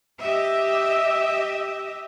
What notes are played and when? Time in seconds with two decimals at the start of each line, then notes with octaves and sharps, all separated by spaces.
0.20 G4 D#5 E5